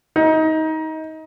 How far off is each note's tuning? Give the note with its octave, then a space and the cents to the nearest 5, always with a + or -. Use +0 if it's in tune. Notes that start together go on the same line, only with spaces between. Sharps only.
D#4 +25